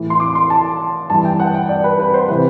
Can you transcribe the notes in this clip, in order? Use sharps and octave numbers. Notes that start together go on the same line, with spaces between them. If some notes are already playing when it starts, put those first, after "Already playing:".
Already playing: A2 E3
C6
D6
C6
A5
G2 E3 A5
G5
F#5
G5
D5
B4
B4
C5
C3 E3 B4